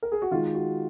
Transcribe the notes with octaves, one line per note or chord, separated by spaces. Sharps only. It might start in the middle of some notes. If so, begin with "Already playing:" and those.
A#4
G#4
F#4
D#3 G#3 F4
F#4